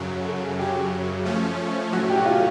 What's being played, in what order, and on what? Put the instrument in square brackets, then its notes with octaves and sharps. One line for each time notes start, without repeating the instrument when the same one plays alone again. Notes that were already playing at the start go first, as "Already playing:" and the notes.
Already playing: [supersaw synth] F#2 C#3 F#3
[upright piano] A4
G#4
[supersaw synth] F#2 C#3 F#3 [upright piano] G4
[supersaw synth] F3 A3 C#4
[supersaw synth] A2 F#3 A3 C#4 [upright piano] F#4
[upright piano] G4
F#4
F4